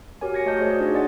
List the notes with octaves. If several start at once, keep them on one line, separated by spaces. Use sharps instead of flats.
F#4 G4 A#4 C#5 G#5
G#6 A#6 C#7
A3 C#5 D#5 A5 G6
F#4 G#4 C5 D5 D#5
D4 D#4 F4 G#4 C#5
D5 D#5 F#5 G#5 A6